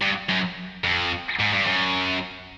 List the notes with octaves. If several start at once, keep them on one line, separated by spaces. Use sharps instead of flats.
G2
F#2
F2
G#2
G2
F#2